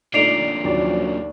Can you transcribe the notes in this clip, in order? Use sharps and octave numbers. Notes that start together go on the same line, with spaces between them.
A#2 D3 A3 D#4 D5 C7 D7 F7
D#2 C#3 F3 F#3 D5